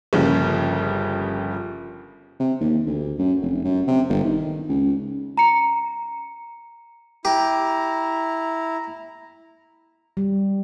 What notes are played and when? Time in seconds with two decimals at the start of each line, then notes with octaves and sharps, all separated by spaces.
0.13 G1 C#3 F3 G3 A#3
2.40 C3
2.61 D#2
2.86 D2
3.19 F#2
3.42 F1
3.64 F#2
3.87 C3
4.09 G1
4.24 D#3
4.69 C#2
5.38 A#5 C#7
7.25 E4 G4 A#5
10.17 G3